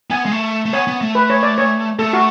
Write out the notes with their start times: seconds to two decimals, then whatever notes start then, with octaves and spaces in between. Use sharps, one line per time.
0.10 B3 G#5
0.26 G#3
0.31 A3
0.65 A3
0.73 B3 C#5
0.87 B3
1.01 A3
1.15 B4
1.30 C#5
1.43 D5
1.58 C#5
1.99 A3 A4
2.13 F#4